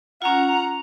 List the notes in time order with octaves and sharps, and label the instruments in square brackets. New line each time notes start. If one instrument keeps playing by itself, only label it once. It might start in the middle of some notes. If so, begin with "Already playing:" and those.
[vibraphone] C#4 F4 [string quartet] F#5 A#5